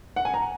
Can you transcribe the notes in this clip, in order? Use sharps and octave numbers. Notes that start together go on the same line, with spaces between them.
F#5
G#5
A#5